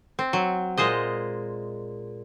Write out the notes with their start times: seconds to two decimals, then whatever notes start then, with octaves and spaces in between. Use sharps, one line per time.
0.19 C4
0.33 F#3
0.77 A#2 G#3 C5 D#5